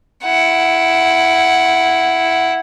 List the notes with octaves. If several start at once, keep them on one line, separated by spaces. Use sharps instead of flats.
E4 F#5